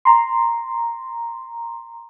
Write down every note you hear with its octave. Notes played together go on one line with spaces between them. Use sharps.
A#5 C6